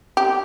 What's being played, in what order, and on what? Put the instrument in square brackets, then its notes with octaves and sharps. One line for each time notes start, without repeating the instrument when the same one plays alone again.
[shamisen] G4